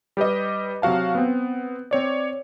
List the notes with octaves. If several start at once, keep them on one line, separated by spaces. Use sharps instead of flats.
G3 G4 B4 D#5
C3 F#3 F#4 F5 A5
B3 C4
C4 C#5 D5